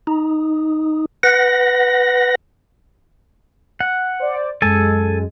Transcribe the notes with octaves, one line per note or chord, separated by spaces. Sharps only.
D#4
B4 F#5 A#6
F#5
C5 D5
F#2 G#3 A4 G#5 A5